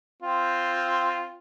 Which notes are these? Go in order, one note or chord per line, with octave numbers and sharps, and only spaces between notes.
C4 F4